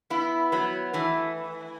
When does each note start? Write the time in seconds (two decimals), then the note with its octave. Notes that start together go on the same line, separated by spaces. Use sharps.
0.10 B3 E4
0.52 F#3 B3
0.93 E3 A3